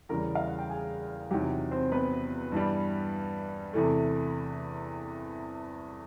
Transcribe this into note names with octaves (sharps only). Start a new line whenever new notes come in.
E2 C#3 E3 G3 A#4 A#5
F5
F#5
G5
G#4 G#5
E2 C3 D#3 F#3 G4 G5
C4 C5
B3 B4
G2 E3 G3
E2 C3 E3 A3